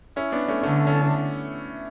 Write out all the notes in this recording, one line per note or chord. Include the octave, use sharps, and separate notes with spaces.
C#4 E4
B3 D4
A3 C#4
D3 A3 C#4
C#4 E4